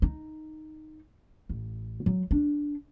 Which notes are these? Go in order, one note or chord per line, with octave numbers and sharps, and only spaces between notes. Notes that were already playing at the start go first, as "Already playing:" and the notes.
D#4
A1
F#3
D4